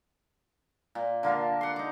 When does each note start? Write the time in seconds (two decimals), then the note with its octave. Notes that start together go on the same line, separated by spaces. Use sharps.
0.95 A#2
1.23 D3 A#3 F4 A5
1.61 F#5 C6
1.76 D#4 D6